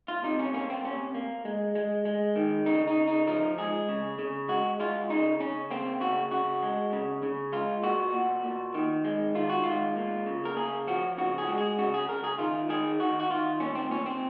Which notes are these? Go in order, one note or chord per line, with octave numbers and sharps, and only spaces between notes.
F4
C3 D#4
C#4
A#3 C#4
C4
C3 C#4
A#3
G#3
G#3
G#3
D#3
C#3 D#4
D#4
C#3
D#4
F3 D#4
G#3 G#4
C#3
C#3
G#3 F#4
G#3 F4
C#3 D#4
C#3 C#4
A#3 C4
C#3 F#4
C#3 F#4
G#3
C#3
C#3
G#3 F4
A#2 F#4
A#2
A#2
D#3
G#3
D#3 F4
F#4
G#3 F4
A#3
C#3
A#4
A#3 G#4
F3 F#4
C#3 F#4
G#4
G#3 F#4
G#4
C#3 F#4
G#4
C#3 A#4
G#4
D#3 F4
D#3 G#4
D#3 F#4
F#4
D#3 F4
A#2 C#4
C4
A#2 C#4
C4